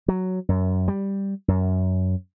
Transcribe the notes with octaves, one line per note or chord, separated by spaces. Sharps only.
F#3
F#2
G3
F#2